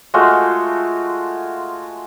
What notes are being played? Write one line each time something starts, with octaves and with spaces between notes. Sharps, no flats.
G#3 A3 F4 F#4